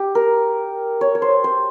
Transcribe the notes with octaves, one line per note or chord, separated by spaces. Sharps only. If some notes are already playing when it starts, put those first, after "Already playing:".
Already playing: G4
A#4
C#5
C#5
C5
C5